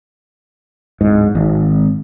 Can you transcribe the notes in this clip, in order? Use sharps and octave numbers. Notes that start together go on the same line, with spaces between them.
D1 G#2
G#1